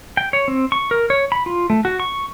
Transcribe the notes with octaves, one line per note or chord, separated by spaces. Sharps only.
G5
C#5
C4
C#6
A#4
C#5
B5
F4
A3
F#4
C#6